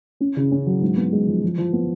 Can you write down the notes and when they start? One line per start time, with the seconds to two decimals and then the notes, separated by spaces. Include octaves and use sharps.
0.20 C#4
0.36 C#3
0.52 C#4
0.66 F#3
0.82 G#2
0.97 B3
1.13 G#3
1.27 F3
1.43 F3
1.58 F3
1.73 B3